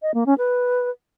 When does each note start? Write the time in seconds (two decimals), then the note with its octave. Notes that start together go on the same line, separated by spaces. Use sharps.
0.02 D#5
0.14 A#3
0.26 C#4
0.38 B4